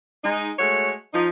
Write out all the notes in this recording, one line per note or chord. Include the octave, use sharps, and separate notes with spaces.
G#3 D#4
G#3 A3 F#4 C#5
F3 D#4